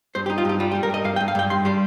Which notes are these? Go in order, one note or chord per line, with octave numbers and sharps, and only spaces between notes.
G2 C5
G4
D#4
F4
G2 G4
G3 F4
G4
G3
A#4
G2 D#5
G2 F5
G5
G2
F5
G2 G5
G2 C6
G3 C6